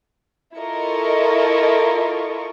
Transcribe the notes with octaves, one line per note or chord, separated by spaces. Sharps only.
E4 F4 A4 A#4 D#5 C#6